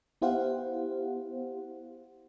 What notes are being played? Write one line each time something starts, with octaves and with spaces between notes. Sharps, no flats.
B3 E4 G4 C5 F5 F#5